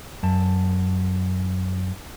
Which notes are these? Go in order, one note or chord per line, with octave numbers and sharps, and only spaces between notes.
F#2 A5